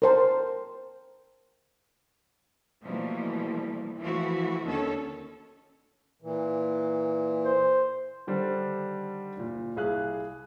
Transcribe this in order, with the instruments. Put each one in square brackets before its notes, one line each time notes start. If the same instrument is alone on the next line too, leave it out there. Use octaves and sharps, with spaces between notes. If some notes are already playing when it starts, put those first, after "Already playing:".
[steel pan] A#4 C5 A5
[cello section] B2 E3 F3 G3 A3 A#3
E3 F3 A3 E4 F#4
D#2 D3 D#3 C#4 A4 C#5
[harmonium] A#2 E3
[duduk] C5
[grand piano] D3 D#3 G3 D4 C5
F#1 A#2
C2 G#4 F5 F#6